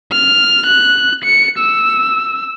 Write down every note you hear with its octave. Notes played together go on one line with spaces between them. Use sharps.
F6
F#6
C#7
E6